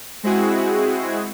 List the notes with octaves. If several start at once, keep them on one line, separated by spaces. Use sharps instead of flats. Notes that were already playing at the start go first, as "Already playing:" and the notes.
G#3 C4 E4 F#4 G#4